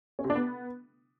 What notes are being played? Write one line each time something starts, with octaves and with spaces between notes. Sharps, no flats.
C#4
C3
D4
B3